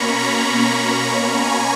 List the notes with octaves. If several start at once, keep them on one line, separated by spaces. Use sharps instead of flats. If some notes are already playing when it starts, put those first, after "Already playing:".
Already playing: B2 A#3 C#4 A#5 B5 C#6
A#5
B5
A#5
G#5